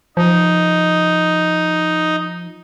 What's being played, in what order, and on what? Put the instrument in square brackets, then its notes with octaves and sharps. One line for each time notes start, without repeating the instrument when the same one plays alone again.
[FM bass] F3 [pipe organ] D#4